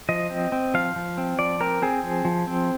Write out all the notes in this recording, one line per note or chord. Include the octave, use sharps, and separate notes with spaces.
F3 D#5
C4
C4
F3 F5
F3
C4
F3 D5
C4 A#4
C4 G#4
F3
F3
C4